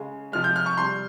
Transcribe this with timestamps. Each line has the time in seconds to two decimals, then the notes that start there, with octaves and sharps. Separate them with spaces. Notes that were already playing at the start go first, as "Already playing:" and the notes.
Already playing: C#3 G#3
0.32 C3 F3 G#3 F6
0.44 G6
0.56 F6
0.66 C#6
0.77 C3 G3 C6